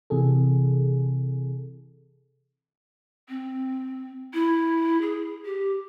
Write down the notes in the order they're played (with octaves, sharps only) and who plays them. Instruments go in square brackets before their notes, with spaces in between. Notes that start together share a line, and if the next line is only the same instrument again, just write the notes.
[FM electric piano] C3 E3 G#4 A4
[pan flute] C4
E4
G#4
G4